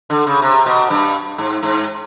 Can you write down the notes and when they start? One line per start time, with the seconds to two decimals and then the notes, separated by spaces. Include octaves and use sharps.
0.10 D3
0.27 C#3
0.42 C3
0.66 B2
0.90 G2
1.38 G#2
1.63 G#2